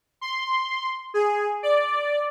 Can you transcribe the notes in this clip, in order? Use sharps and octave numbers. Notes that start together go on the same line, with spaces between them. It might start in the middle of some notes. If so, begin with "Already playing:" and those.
C6
G#4
D5